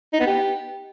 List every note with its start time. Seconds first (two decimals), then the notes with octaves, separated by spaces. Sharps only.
0.13 D#4
0.20 B3
0.27 G4